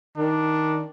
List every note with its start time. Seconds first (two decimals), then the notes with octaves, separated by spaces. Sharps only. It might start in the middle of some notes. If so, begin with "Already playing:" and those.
0.17 D#3 D4